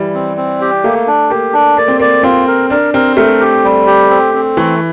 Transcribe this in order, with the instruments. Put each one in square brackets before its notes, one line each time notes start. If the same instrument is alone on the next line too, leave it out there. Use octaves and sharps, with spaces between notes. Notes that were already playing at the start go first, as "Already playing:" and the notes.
Already playing: [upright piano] E3 G3
[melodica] C4
C4
G4
[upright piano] A3 [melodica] A#3
[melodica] D4
[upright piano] A#3 [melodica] G4
[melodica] D4
[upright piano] A#3 [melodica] D5
[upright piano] C4
[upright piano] A#3 [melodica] D5
[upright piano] C4 [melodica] F4
[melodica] A#4
[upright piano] D4 [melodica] A#4
[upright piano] C4 [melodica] A#4
[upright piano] A3 [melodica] A#4
[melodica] G4
G3
G4
C4
C4
[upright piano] E3 [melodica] A3